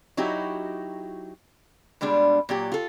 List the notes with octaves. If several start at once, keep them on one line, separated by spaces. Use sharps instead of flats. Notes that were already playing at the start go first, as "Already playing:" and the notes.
F#3 D#4 E4 F#4 G4
B2 G3 G#3 D4
A#2 F#3 G4
F4 A4